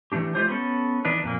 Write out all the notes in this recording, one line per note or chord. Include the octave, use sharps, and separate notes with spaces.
E3 G3 A3 D4 G4
G#3 A3 F4 G4 C5
B3 C#4 A4
E3 D4 D#4 B4
F2 A#2 A#3